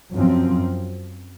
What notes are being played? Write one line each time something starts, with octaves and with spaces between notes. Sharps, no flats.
F#2 F3 C4